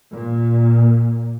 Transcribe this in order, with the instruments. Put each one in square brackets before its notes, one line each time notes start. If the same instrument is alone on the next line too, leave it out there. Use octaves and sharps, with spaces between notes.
[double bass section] A#2